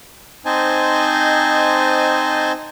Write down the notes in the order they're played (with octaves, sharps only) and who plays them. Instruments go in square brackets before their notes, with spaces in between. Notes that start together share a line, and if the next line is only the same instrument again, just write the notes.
[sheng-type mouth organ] C4 D#4 C5 D#5 G#5 A5